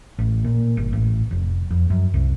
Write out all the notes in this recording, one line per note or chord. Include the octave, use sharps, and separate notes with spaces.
A1
A#2
G1
A1
F1
F2
F#2
C2